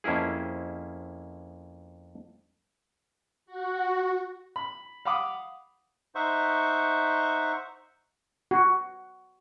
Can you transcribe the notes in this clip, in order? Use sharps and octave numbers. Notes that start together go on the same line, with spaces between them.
F2 A#3 C#4 E4 G#4
F#4
B5
F5 F#5 B5 D6 D#6
D#4 C5 E5 F#5 C#6
F#4